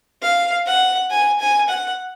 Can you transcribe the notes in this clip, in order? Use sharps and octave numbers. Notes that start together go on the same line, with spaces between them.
F5
F#5
G#5
G#5
F#5